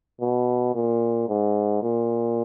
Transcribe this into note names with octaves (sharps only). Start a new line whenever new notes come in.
B2
A#2
G#2
A#2